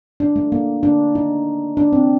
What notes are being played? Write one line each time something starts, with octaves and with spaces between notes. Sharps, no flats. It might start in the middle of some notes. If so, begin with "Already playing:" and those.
D4
A3
A#3
D4
D#4
D4
C4